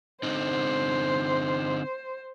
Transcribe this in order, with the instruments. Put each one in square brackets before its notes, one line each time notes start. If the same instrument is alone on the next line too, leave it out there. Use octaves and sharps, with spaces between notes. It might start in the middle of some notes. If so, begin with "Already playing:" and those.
[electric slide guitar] D3 C4 D#4 [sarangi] C5